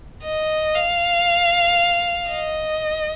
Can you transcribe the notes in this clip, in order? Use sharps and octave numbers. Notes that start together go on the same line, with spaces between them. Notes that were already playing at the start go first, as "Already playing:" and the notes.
D#5
F5
D#5